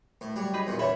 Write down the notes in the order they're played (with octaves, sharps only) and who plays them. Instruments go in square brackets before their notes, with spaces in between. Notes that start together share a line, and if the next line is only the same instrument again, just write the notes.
[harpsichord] A2
F#3 G3
[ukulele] D#4 G#4 B4
[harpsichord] E2 A#2
[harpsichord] E3 C#4 [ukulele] C#5 E5 B5